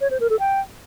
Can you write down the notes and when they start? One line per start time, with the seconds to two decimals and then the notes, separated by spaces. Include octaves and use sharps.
0.01 C#5
0.11 C5
0.20 A#4
0.30 A4
0.40 G5